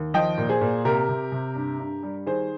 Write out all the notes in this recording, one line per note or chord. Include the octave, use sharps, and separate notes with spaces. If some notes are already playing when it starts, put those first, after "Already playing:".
Already playing: D#2
F3 D#5 G5
A#2
G#4 C5
A#2
C3 G4 A#4
C3
C3
G2
G2
G3
D#3 G#4 C5